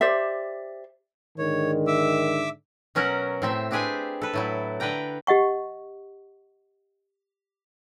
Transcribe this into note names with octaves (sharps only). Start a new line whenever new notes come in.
G4 C5 D5 E5
G#2 D3 D#3 C#5
E5 D6 E6
B2 F#3 C#4 A#4 F#5
A2 C4 E5
C4 D4 G4 G#4 B4 G#5
A4 B4
A2 F#3 E4
D3 B4 D5 G5 A#5
G4 D#5 F#5 C#6